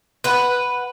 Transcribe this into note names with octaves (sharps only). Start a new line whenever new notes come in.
B4 F#5